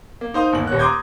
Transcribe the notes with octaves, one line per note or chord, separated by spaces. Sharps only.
A#3
D#4 C5 F5 D#6
G1 D#2 A#3 F#7
D#1 C#5 F#6
A#5 C6 D6 D#6 G6 G#6